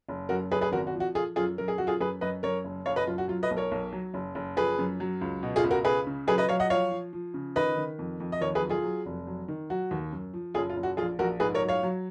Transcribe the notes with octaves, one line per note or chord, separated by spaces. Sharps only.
F#1
F#2 F#4 A#4
F#1 G#4 B4
G#4 B4
G#1 F#4 A#4
F#4
F3
F#4
F3 F4 G#4
F#2 F4 G#4
F#2 A#4
G#4
F#2 F#4
F4 G#4
F#2 G#4 B4
F#2 B4 D#5
F#2 A#4 C#5
F#1
F#1 C#5 F5
B4 D#5
F#2 F4
F#4
F#3 F4
B4 D#5
B1
A#4 C#5
B1
F#3
F#1
F#1
F3 G#4 B4
F#2
F#3
C#2
B2
F4 G#4
C#2
F#4 A#4
C#2 G#4 B4
C#3
F#3 G#4 B4
B4 D#5
F#3 C#5 F5
D#5 F#5
F3 C#5 F5
F3
F3
C#3
D#3 B4 D#5
D#3
F2
F2
D#5
D#2 A#4 C#5
G#4 B4
F#3
F4 G#4
F#3
F1
F#3
D#3
F#3 F#4
D#2
F#2
F3
F#1 F4 G#4
F4
F#1
F#4
A#1 F4 G#4
A#1 F#4 A#4
G#2 G#4 B4
A#4 C#5
F#3
C#5 F5
F#3